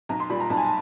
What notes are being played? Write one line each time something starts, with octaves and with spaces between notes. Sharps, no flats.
B1 A#5
C6
A#2 G3 B5
A#5
B1 A5
G#5
A5